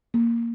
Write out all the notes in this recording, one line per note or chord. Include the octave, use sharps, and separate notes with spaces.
A#3